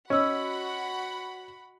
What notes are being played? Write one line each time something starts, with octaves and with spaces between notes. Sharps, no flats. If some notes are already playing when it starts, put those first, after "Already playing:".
C#4 F#4 D#5 F#5 B5 E6